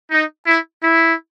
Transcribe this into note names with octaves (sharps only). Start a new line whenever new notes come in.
D#4
E4
E4